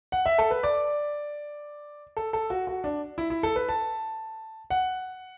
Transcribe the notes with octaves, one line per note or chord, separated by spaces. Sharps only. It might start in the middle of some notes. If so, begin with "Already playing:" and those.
F#5
E5
A4
B4
D5
A4
A4
F#4
F#4
D4
E4
E4
A4
B4
A5
F#5